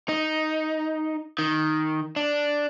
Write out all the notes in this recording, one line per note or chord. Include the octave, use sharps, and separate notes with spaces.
D#4
D#3
D4